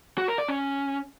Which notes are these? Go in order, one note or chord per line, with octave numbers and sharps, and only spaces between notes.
F#4
A#4
D5
C#4